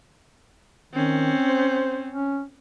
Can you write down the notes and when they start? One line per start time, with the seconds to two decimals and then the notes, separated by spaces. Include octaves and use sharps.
0.93 D#3 C4 C#4
1.49 C5
2.10 C#4